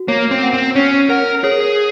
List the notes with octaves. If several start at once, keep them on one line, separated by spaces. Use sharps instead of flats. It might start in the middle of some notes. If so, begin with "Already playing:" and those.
Already playing: F#4
A#3 C#5
C4
F#5
C4
C#4 C#5
A#4 F#5
G#4 C#5